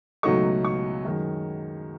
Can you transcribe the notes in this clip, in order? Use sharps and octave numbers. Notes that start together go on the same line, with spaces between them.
C#2 B2 F#3 A3 D#4 C#6
C#6
F#2 D#3 G#3